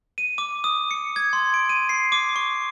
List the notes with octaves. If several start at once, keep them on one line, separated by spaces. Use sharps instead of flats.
D#7
D6
D#6
C#7
G#6
C6
D7
D#7
C7
D6
C#6